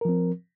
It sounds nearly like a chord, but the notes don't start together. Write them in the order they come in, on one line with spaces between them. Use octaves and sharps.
A#4 F3 C4